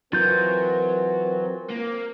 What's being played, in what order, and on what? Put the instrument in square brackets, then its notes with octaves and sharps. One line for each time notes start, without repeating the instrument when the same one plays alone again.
[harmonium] E3 [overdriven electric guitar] F#3 [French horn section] C4 A#4 [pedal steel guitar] F4 G6
[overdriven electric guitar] A#3